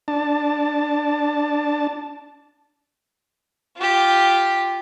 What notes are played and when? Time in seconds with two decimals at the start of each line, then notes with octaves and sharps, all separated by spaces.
0.08 D4 A5
3.78 F4 G4